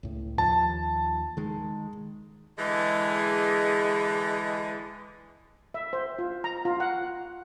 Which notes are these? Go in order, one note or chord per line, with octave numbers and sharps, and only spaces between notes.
C#2 A2
D#2 F3 A5
D#3 G#3
D3 E3 G#3
E5
C5
F4
A#5
F4
F#5